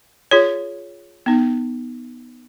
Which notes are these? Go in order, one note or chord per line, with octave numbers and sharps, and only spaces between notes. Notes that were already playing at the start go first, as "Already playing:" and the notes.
F4 G#4 C#5
B3 D#4